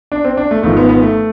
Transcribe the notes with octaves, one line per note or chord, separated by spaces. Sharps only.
D4
C4
D4
A3
G#1 G#2 F3 A3
B3
B3
A3